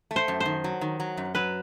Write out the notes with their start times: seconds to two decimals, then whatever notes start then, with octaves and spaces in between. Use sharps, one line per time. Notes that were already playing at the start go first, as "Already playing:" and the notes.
0.11 A3
0.16 C5
0.28 F#2
0.40 C5
0.45 D#3
0.64 F#3
0.81 D#3
1.00 F#3
1.17 F#2
1.35 F#3 B4